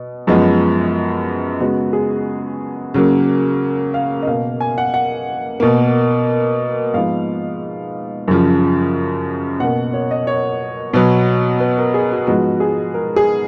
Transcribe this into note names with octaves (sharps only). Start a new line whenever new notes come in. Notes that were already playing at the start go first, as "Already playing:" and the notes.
Already playing: B2
F#2 F3 G#3 B3
C#3 G#3 B3 F#4
G#4
C#3 F#3 A#3
F5
D#5
B2 A#3 F5
G#5
F#5
F#5
B2 A#3
G#2 F3 B3 F5
F#2 C#3 F3
B2 A#3 F#5
C#5
D#5
C#5
B2 F#3 B3
B4
A#4
G#4
F#4
G#2 F3 G#3 B3 F#4
G#4
A#4
G#4